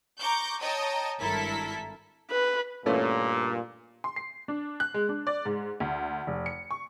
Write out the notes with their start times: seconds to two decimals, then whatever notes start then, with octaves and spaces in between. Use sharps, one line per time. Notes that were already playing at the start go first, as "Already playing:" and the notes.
0.20 A#5 C#6 D6 G6
0.61 C#5 D#5 G5 A5 A#5 D#6
1.19 G#1 G2 E4 A4 A#4 B6
2.30 B4
2.86 G2 A#2 E3 A3 C#4
4.04 C6
4.16 C7
4.48 D4
4.80 F#6
4.94 G#3
5.09 D4
5.27 D5
5.45 G#2
5.80 D2
6.27 F1
6.46 C#7
6.71 C#6